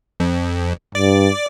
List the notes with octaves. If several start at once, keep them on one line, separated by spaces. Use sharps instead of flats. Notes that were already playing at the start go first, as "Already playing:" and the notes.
F2
G2 D5 D6